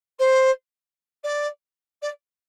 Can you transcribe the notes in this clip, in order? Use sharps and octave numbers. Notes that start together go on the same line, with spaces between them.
C5
D5
D5